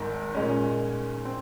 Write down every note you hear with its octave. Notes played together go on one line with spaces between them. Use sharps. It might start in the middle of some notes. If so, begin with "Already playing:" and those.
Already playing: G#1 G#2 D#3
A#2 G#3 C#4
C4